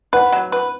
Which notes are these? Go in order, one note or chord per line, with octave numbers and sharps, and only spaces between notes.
B4 F#5
F#3
B4